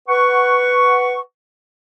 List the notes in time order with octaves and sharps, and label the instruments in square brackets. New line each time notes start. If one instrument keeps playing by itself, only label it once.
[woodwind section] B4 F#5 C#6